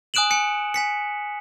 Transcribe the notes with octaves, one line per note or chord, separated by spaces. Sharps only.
G#5 D#6 F#6 D7 E7 F#7
G#5 C#7
G#5 B6 C#7